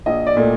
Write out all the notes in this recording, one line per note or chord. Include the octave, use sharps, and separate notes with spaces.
A#1 D#5
D5
A#2 A3